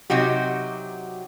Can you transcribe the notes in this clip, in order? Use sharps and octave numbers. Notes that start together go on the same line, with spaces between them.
C3 F#3 D#4 F#4 G4